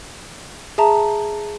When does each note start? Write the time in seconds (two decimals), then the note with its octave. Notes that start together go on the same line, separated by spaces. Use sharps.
0.78 G#4 E5 A5 A#5